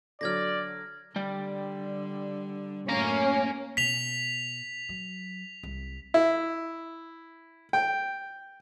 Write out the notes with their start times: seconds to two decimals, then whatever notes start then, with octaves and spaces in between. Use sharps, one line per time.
0.21 D3 F#3 D5 F6 G#6 A#6
1.16 D3 G3 D5 G5
2.89 F#2 A2 A#3 C#4 A#5
3.77 B2 B6 F7
4.89 F#3
5.63 C2
6.14 E4
7.73 G5